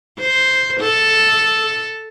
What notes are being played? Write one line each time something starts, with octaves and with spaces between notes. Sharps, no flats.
C5
A4